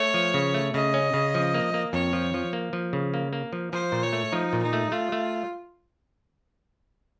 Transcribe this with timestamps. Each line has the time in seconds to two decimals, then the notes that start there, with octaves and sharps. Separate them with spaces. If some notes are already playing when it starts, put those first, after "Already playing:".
Already playing: A3 C#5
0.14 F3
0.34 C#3
0.54 A3
0.74 C#3 D#5
0.94 C#4
1.14 C#3
1.34 F3
1.54 A#3
1.74 A#3
1.93 F2 C#5
2.13 F3
2.34 F3
2.53 A#3
2.73 F3
2.93 C#3
3.14 A#3
3.33 A#3
3.53 F3
3.73 F3 C5
3.92 A#2
4.03 C#5
4.13 A3
4.32 F3 D#4
4.53 A#2
4.63 D#4
4.73 A3
4.92 A3 F4
5.12 A3